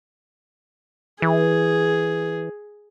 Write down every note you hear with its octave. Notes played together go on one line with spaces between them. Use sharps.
E3 G#4